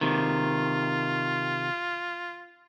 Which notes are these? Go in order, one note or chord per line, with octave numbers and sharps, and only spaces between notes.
C3 D#3 F4